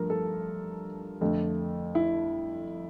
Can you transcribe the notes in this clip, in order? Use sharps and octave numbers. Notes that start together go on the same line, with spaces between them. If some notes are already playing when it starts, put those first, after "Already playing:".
Already playing: G2 F3 A3 A#4
A4
F2 D3 A3
E4